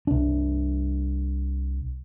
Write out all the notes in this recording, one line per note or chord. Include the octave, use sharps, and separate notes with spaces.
C2 D4